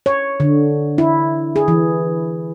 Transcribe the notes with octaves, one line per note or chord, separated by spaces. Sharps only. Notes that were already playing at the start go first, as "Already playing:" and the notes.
C#5
D3
E4
G#4
E3